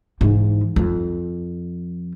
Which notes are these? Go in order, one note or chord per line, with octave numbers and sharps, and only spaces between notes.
G#2 E3
F2